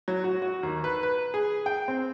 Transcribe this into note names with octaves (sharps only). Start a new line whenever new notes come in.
F#3
F#4
F#4
D#2
B4
B4
G#4
G5
C4